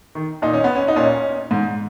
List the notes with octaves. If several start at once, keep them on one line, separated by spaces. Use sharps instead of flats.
D#3
A#2 D#4
C#4
B3
C#4
D#4
A#2 C#4
G#2